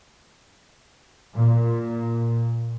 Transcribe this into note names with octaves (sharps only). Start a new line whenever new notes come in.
A#2